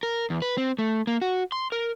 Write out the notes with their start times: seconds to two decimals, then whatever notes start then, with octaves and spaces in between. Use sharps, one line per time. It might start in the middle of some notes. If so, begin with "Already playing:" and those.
0.03 A#4
0.30 E2
0.42 B4
0.57 C4
0.79 A3
1.07 A#3
1.22 F#4
1.52 C6
1.72 A#4